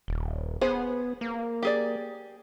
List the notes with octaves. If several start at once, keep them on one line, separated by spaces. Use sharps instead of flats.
D#1
B3 G#4 C5
A#3
G4 G#4 D5